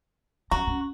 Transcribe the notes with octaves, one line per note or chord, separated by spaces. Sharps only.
F3 C#4 F#4 A#5
C#4